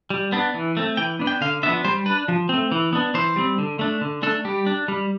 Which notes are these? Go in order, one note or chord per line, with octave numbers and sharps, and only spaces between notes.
G3
B3 D4
E3
A3 C4
E3 G5
B3 D4
G5
D3 F5
F3 B3 D4 E5
G3 C5
D4 B4
F3
A3 C4
E3
B3 D4
E3 C5
G3 C4
D3
A3 D4
D3
A3 D4 A4
G3 G4
D4
G3